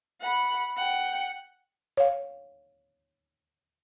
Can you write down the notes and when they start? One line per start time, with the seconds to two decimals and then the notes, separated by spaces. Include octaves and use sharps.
0.21 F#5 B5
0.77 F#5 G5
1.97 C#5 F5